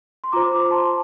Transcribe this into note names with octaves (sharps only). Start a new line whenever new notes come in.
C6
F4 C5 A#5 D6
A#5 D6
A5 C6